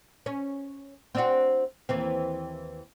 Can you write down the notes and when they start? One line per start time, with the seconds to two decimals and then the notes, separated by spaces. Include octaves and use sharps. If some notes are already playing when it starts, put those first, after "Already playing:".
0.26 C#4
1.15 C4 D4 F#4
1.89 D#2 E3 C4